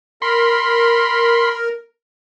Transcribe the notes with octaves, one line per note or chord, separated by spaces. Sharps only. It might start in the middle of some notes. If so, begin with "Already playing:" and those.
A#4 B5 C6